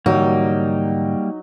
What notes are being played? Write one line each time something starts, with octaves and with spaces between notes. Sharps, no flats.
G#2 D3 E3 F#3 G3 A#3 D#4